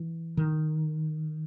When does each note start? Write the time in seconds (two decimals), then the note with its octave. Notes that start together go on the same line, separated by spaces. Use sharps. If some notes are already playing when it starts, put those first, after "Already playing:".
Already playing: E3
0.37 D#3